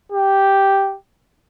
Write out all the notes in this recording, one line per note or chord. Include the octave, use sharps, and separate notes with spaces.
G4